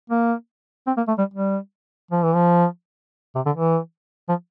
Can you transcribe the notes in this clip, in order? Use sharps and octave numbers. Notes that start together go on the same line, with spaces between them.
A#3
C4
A#3
A3
G3
G3
F3
E3
F3
C3
D3
E3
F3